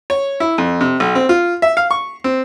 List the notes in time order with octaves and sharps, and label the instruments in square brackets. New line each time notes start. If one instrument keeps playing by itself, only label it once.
[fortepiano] C#5
E4
F2
C3
B1
C4
F4
E5
F5
C#6
C4